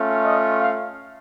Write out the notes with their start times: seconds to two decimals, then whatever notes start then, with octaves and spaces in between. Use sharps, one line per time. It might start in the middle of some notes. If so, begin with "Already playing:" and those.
Already playing: A3 C#4 F4
0.24 D#5
0.59 F5